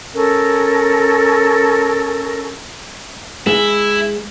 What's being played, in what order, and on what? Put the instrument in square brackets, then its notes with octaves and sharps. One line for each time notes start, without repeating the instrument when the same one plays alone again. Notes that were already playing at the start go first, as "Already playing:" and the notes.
[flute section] C#4 A4 A#4
[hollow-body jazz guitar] G#3 [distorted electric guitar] E4